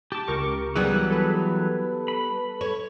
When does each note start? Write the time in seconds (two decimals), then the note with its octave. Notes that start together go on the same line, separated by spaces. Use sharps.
0.12 G4 A5 D6
0.28 C#2 A#4 C#6
0.76 E3 F#3 G3 B3 G#4
1.11 A4 B4
2.08 B5
2.61 C#5